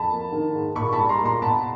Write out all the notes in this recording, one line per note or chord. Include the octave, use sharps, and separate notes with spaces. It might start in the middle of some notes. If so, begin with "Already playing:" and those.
Already playing: F2 A5 B5
A#3
D#3
G#2
A#2 B5 C#6
A5 B5
G3
A#5 C6
A#2 A#5 C6
B2 A5 B5